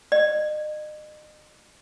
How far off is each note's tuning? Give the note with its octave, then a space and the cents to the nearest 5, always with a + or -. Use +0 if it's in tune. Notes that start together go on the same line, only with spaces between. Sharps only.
D#5 -35